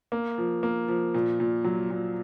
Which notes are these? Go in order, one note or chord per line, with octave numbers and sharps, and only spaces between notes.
A#3
F3
A#3
F3
A#2
A#2
F#3
A#2